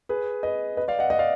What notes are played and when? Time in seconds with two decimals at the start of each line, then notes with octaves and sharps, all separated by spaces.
0.09 G#4 B4
0.43 B4 D#5
0.77 B4 D#5
0.88 D5 F5
0.99 D#5 F#5
1.10 D#5 F#5
1.19 D5 F5